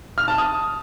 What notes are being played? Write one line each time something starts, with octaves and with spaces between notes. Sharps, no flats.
F6
A5
D#6